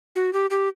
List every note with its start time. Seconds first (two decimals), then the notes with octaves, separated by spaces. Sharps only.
0.16 F#4
0.33 G4
0.50 G4